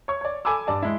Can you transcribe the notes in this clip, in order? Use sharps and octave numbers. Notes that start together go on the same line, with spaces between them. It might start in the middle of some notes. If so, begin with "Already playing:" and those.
C#5 C#6
C#5 D5
A4 G#5 B5 D6 E6
G2 D5 A5
G#3 E4